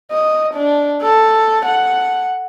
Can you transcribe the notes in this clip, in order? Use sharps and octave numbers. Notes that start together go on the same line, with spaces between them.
D#5
D4
A4
F#5